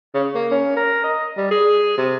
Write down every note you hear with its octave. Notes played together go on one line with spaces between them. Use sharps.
C#3
A#3
C#4
A#4
D#5
G3
G#4
C3